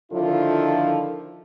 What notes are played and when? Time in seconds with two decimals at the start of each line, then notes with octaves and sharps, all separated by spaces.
0.12 D3 D#3 F3 E4 F4 A4